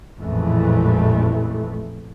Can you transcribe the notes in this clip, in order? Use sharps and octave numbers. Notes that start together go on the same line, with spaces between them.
A1 F2 A#2 E3 G#3 A3